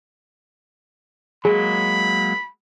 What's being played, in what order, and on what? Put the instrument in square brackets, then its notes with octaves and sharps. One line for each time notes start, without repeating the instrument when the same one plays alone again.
[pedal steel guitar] F#3 G#3 A#3 [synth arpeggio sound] G#4 [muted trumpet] B5